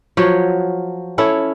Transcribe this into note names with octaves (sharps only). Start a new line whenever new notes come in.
F3 F#3 C#5
C#4 E4 A4 C#5